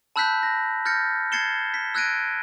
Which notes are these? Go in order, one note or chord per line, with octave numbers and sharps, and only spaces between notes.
A5 B5 E6 F#6 G6 B6
A#6
F6 G6 A6 A#6 C#7
G#6 A6 C7 C#7 E7 G7
B6
E6 F#6 G#6 A#6 D7 D#7